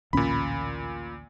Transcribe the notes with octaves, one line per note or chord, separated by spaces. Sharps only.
A1 D2 A#2 C#4 B5